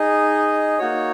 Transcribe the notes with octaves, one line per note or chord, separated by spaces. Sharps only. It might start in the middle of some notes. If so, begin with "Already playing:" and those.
Already playing: D#4 G#4 D#5
A#3 D#4 F#4 C#5